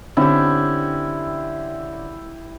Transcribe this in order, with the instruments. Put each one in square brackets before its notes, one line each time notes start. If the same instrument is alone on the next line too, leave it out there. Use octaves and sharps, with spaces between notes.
[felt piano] D3 C4 C#4 [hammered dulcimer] E4 G4